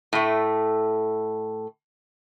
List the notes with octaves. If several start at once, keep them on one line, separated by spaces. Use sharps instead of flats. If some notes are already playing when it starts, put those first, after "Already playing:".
A2 A3